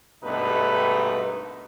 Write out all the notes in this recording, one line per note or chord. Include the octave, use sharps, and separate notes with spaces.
G#1 G2 B2 A3 D#4 B4